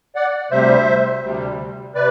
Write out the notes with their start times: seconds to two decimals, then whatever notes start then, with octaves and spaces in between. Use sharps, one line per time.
0.15 D5 F#5
0.51 D2 C3 G3 C5 E5
1.23 D2 C3 G3
1.95 C3 B4 D5